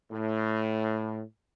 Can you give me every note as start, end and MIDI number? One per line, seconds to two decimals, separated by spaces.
0.12 1.22 45